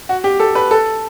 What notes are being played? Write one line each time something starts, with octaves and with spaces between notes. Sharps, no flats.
F#4
G4
A4
B4
A4